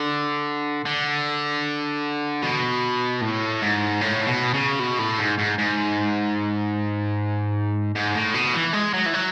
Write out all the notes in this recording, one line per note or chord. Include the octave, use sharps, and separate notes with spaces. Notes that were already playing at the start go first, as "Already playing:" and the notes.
Already playing: D3
D3
B2
A2
G#2
A2
B2
C#3
B2
A2
G#2
G#2
G#2
G#2
A2
B2
E3
G#3
F#3
E3
F#3